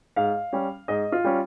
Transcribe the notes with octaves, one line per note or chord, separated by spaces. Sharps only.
G#2 F5
G3 C#4
G#2 D#5
F4
G3 C#4